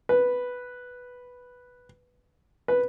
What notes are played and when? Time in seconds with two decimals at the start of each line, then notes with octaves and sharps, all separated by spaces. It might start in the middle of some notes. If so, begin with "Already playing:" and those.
0.09 B4
2.68 B4